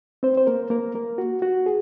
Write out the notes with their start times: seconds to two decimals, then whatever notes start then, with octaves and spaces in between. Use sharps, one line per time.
0.23 C4 C5
0.37 C5
0.47 A#3 A#4
0.70 A#3 A#4
0.95 A#3 A#4
1.18 F#4
1.42 F#4
1.66 G#4